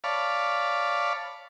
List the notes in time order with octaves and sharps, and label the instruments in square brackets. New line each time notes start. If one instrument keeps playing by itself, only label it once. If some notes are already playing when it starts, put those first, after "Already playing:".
[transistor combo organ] C#5 D5 F5 A5 B5